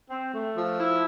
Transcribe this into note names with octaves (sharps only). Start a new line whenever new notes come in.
C4
A3
F3
E4